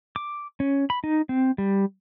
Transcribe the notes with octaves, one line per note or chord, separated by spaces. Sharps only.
D6
C#4
B5
D#4
C4
G3